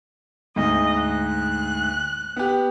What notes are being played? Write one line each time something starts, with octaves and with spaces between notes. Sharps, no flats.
D2 G#2 D#5
F#6
B3 G4